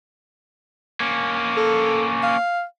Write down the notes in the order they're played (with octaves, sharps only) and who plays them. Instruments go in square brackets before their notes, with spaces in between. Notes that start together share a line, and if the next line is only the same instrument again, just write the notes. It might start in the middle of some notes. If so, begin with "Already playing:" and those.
[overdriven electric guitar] A#3 C#4
[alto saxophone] A4
F5